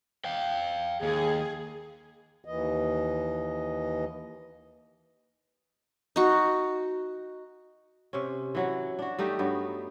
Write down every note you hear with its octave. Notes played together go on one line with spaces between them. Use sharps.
F5 G5
D#2 G#4
D#2 E3 D#5
D#4 F#4
C3 C#4
E3 F#3 F#5
D4 F#4
G3 A3 D#4 G4
G2 F#3 B3